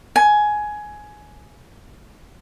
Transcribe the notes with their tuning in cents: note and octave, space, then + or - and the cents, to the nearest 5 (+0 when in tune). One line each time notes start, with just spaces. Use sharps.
G#5 +15